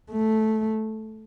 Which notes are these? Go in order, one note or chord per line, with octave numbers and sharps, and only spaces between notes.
A3